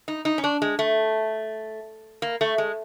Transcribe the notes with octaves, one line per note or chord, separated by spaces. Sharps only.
D#4
D#4
C#4
D4
G#3
A3
A#3
A3
G#3